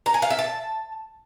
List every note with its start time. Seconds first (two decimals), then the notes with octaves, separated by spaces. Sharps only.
0.06 A#5
0.14 G#5
0.22 F5
0.30 E5
0.39 A5